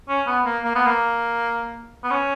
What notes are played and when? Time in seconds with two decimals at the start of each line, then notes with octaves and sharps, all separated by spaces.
0.09 C#4
0.27 B3
0.46 A#3
0.64 A#3
0.75 B3
0.86 A#3
2.04 B3
2.11 C#4